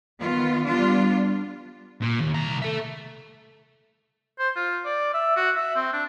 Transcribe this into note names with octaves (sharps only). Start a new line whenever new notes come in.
D#3 B3 F4
G3 B3 D4 F4
A#2
D#2
C2 A#5
A4 E5
C5
F4
D5
E5
F#4
E5
C4
D4